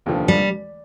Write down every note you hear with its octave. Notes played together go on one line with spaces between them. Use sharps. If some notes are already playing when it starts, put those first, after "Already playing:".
F1 D#2 D3 F3
G3